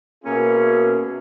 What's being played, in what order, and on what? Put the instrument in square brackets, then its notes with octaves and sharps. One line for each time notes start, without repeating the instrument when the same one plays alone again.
[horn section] B2 A#3 C#4 E4 G#4